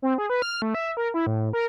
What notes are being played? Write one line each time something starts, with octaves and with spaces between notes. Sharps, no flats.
C4
G#4
B4
F6
A3
E5
A#4
E4
A2
A#4